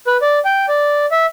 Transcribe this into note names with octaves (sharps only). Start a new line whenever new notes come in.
B4
D5
G5
D5
E5